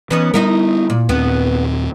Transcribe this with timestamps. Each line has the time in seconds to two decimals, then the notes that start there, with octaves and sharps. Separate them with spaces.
0.11 E3 B3 C#4 D#4
0.34 G3 B3 D#4 E4 A#4
0.90 A#2
1.09 D#2 A#2 B3 C4